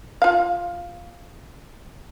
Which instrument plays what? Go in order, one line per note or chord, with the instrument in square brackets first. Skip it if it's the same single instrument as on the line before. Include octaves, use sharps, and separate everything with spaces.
[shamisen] F4 F5